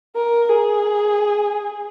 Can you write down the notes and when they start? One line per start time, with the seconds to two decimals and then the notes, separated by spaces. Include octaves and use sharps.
0.15 A#4
0.49 G#4